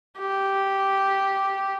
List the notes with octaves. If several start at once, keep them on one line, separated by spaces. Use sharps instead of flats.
G4